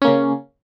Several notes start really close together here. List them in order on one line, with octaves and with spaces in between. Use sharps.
C#4 A#3 C#3